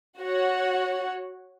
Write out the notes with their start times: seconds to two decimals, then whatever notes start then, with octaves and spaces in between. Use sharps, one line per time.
0.19 F#4 C#5 F#5